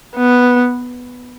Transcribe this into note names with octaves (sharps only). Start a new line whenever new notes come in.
B3